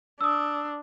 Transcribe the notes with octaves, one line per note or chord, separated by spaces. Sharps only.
D4 D#6 E6